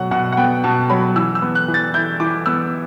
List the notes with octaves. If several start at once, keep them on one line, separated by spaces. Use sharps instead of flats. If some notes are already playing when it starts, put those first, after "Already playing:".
Already playing: B2 F#3 F#5
B2 F#5
F#5
B3 G5
B2 A5
F#3 B5
E3 E6
E6
B3
F#6
E3
A6
E4 G6
E3 D6
B3 E6